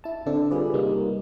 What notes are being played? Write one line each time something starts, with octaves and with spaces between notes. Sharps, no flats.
E4 A5
D3 C4 D4 A4
G3 F4 G#4 B4 D5
C3 G3 A#3 D#4